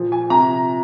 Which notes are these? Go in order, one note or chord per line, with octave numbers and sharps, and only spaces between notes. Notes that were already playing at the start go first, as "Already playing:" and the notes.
Already playing: A#2 F3
G#5
C3 F3 A#5